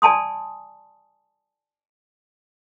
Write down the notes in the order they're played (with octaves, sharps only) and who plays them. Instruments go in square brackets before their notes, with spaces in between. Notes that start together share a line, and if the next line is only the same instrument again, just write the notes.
[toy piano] D5 G#5 A5 C6 D#6